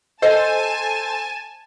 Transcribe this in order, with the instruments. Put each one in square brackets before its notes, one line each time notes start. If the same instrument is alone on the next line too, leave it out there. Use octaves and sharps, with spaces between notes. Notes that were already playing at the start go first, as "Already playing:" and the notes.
[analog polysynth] A4 C5 [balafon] D#5 [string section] G#5 A5